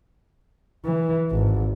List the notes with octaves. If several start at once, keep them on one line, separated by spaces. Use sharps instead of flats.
E3
G#1